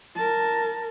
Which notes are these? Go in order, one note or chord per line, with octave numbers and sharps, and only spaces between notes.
A#4 A5